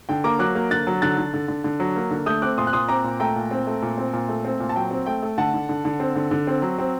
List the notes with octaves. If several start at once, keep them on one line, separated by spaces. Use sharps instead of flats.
D3 G5
A#3 A#5 D6
F#3 D6 F#6
A#3
D3 F#6 A6
F#3
D3 F#6 A6
D3
D3
D3
D3
F#3
A#3
D3
A3 D#6 G6
C4 D6 F#6
A#2 C6 D#6
F#6
A#2 C6 D#6
C4 A#5 D6
A#2
A3 G5 A#5
A#2
C4
A3
A#2
C4
A#2
A3
C4
A#2
A5
F#3 G5
C4
A3 G5
A3
D3 F#5 A5
D3
D3
D3
C4
D3
D3
C4
F#3
C4